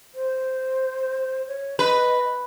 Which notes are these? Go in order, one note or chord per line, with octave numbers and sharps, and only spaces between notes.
C5
C#5
B4 D#5